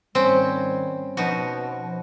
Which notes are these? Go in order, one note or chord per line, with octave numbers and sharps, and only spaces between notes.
G#2 D#3 G3 C4 C#4
B2 F3 D#4 F#4